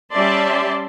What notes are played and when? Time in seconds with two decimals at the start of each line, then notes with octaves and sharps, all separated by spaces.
0.12 G3 C#4 D5 E5 A5 C6